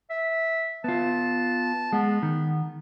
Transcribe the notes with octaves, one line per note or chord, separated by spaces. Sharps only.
E5
B3 F4 A5
G#3 B3
D#3